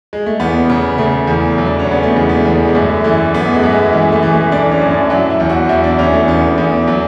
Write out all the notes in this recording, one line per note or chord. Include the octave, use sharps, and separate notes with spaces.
G#3
A3
E2 B3
C#3
C#3 A3
E2
F#3
D4
C#4
C#3 B3
A3
E2 G#3
B3
A3
E2
G#3
F#2 A3
E3 A3
F#2 B3
G#3
F#2
G#3
E3 G#3
A3
E3
A3
E3 D4
C#4
F#2
D4
F#3 E4
E4
E2
F#4
E2 E4
D4
E2 C#4
A3
E2 B3
E2
F#3